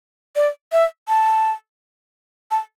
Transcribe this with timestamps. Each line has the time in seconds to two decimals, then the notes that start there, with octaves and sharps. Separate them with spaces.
0.36 D5
0.72 E5
1.08 A5
2.51 A5